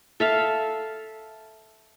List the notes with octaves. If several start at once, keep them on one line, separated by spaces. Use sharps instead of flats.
A4 E5 F5